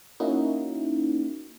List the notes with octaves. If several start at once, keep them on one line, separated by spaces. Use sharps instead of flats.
A#3 C#4 D#4 E4 F#4